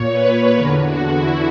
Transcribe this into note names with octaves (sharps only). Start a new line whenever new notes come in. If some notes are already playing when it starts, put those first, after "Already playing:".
Already playing: A#2 C#5
B4
E2 D3 A#4
F#4
E4